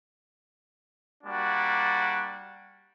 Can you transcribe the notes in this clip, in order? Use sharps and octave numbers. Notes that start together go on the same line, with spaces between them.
G3 A#3 D4 F#4